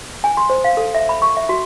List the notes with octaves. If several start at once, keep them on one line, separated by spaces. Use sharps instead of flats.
G#5
C6
C5
F5
A4
E5
B5
C#6
E5
F#4